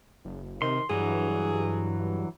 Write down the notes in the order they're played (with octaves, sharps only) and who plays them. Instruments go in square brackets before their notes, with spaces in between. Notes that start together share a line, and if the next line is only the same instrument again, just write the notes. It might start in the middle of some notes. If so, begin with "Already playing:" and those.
[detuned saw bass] F#1
[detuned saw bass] C3 [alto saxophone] D#3 [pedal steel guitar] C6
[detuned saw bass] G2 [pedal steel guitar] E3 F#3 [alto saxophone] G#4